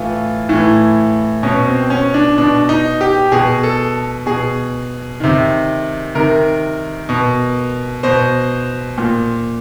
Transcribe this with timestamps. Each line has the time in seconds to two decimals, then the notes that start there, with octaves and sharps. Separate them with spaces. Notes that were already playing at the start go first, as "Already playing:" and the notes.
Already playing: A2 E3 F4
0.49 A2 E3
1.43 B2 C#4
1.67 C4
1.90 C#4
2.14 D4
2.38 B2 D4
2.69 D#4
3.01 G4
3.32 B2 G#4
3.63 A4
4.26 B2 G#4
5.20 C3 D#3
6.15 C3 D#3 A#4
7.09 B2
8.03 B2 C5
8.98 A#2